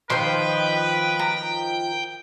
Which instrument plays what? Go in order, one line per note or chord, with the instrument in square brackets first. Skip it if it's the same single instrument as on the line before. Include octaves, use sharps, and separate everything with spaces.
[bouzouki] D#3 F3 [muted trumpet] B4 [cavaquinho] C5 C6 [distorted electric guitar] G5
[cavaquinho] A#5